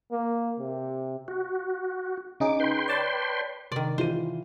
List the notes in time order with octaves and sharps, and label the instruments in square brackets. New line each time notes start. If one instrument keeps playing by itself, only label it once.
[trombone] A#3
C3
[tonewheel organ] F#4
[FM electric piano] C#3 D#4 G#4 [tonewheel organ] D6
[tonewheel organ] B4 G5 C6
[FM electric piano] C#5 D5 A5
[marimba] C3 [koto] D#3 D5
[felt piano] E3 F4 D#7 [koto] C5